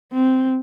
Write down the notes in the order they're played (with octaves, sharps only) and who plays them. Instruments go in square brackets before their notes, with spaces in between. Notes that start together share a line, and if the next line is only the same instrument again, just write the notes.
[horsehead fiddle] C4